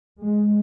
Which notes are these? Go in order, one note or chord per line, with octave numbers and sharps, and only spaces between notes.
G#3